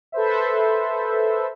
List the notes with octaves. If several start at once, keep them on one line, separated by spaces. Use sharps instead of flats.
A4 B4 C5 E5